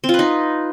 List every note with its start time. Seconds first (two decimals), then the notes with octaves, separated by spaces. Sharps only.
0.04 C4
0.09 F4
0.14 B4
0.19 D#4